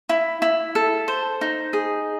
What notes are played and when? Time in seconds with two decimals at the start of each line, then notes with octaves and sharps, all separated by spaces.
0.09 E4
0.42 E4
0.75 A4
1.08 C5
1.41 D#4
1.73 G#4